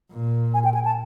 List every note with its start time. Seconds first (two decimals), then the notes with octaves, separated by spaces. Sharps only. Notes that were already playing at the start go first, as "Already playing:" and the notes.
0.11 A#2
0.54 G#5
0.65 G5
0.74 G#5
0.85 A5